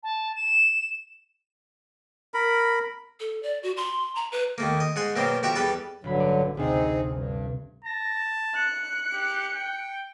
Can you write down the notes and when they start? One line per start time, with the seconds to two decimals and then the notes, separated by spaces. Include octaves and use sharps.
0.03 A5
0.35 E7
2.34 A#4 B5
3.20 A4
3.43 D5
3.63 F#4
3.77 C6
4.15 A#5
4.32 B4
4.58 D#2 A3 A#3
4.80 D#5
4.96 G#2 F#5 G#5 C6
5.16 F#2 B2 F#3 A#3 C4
5.43 F2 F#4 G4 E5
5.56 E2 G3 A4 B4 A5
6.04 A1 G2 D3 F3 F#3 B5
6.20 D5
6.57 D2 C3 C4 D#4 G#4
7.10 G2
7.85 A5 A#6
8.56 F#6 C#7
9.13 G4
9.55 G5